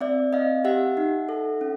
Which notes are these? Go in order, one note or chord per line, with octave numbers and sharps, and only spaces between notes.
C4 D5 E5
C4 D#5 F5
G4 E5 F#5
D#4
A4
C#4